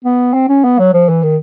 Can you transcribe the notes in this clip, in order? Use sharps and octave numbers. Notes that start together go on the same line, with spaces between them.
B3
C4
C#4
B3
F#3
F3
E3
D#3